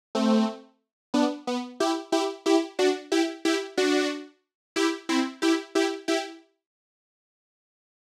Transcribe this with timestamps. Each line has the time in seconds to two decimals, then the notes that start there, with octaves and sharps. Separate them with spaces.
0.15 A3 C4
1.14 B3 D4
1.47 B3
1.80 E4 G4
2.12 E4 G4
2.46 E4 G4
2.79 D4 F#4
3.12 E4 G4
3.45 E4 G4
3.77 D4 F#4
4.76 E4 G4
5.09 C4 E4
5.42 E4 G4
5.75 E4 G4
6.08 E4 G4